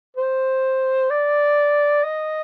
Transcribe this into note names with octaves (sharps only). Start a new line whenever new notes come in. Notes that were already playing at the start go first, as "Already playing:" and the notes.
C5
D5
D#5